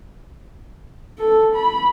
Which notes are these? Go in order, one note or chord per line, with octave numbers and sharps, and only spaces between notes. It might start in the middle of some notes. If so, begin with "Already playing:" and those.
A4
B5